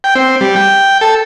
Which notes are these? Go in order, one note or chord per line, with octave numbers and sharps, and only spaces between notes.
G5
C4
G3
G5
A4